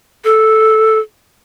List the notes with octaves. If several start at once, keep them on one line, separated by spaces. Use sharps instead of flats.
A4